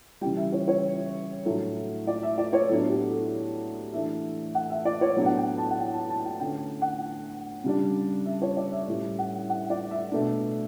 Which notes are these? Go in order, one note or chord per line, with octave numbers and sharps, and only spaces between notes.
C#3 E3 G3 G5
E5
C#5
C#5
A2 F#3 A3 D4
D5
E5
D5
C#5
A2 F#3 B3 D4 A4
G4
A4
E3 A3 D4 E5
F#5
E5
D5
C#5
A2 F#3 B3 D4
F#5
G5
A5
F#5
G5
A5
A5
G5
D3 A3 C#4 G5
F#5
C#3 G3 D4
E5
C#5
D5
E5
A2 G3 C#4 E5
F#5
F#5
D5
E5
B2 A3 D4